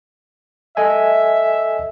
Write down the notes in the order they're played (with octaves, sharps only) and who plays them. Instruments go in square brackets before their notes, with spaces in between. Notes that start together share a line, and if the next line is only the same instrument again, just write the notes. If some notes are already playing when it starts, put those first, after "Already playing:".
[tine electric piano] A4 D#5 G#5 [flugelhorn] E5